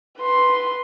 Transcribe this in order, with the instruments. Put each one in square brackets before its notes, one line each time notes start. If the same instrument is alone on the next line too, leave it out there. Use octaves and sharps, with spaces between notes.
[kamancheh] B4 C6